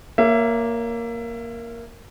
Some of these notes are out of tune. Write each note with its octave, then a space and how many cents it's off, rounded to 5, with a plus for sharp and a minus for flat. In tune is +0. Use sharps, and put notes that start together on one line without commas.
A#3 +0 C#5 +20 E5 +25